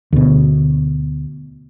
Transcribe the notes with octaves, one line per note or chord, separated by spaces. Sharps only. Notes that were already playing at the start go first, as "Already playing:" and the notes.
D2 B2